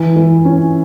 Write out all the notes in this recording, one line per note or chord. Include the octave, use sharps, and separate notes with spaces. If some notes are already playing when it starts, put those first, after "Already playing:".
Already playing: E3
E3
C#4